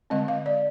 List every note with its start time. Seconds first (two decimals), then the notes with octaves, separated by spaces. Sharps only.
0.10 D3 G#3 C4 D#5
0.28 F5
0.46 D5